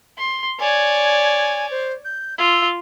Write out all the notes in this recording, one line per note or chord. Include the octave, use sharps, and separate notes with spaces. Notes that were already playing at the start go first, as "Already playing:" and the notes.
C6
C#5 D5 G#5
C5
G6
F4 E6